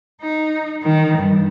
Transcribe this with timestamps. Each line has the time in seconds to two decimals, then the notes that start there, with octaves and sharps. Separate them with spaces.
0.21 D#4
0.83 D#3
1.18 G2